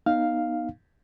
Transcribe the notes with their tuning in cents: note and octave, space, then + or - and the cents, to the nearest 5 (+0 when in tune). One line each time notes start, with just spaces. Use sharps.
B3 -20 D#4 +0 F5 +0